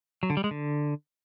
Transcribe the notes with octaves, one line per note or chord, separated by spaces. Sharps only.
F#3
D3
G3
G#3
D3